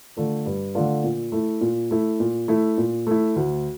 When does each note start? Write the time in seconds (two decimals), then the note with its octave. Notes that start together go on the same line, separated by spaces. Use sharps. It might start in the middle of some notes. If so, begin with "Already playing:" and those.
0.17 D3 A3 D4 F4
0.46 G2
0.75 D3 A3 D4 F4
1.04 A#2
1.32 A3 E4
1.61 A#2
1.91 A3 E4
2.20 A#2
2.48 A3 E4
2.78 A#2
3.07 A3 E4
3.36 D2